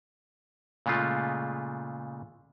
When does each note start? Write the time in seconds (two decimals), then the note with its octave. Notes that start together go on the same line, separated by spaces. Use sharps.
0.86 A#2 C#3 G#3 A3 F4